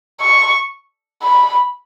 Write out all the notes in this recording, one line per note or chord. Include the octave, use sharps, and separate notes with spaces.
C#6
B5